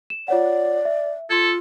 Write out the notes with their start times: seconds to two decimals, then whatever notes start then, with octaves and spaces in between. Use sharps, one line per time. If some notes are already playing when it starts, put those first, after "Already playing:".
0.10 E7
0.28 F4 C#5 D5 F#5
0.85 E5
1.30 F4 A4 C6 E6 G#6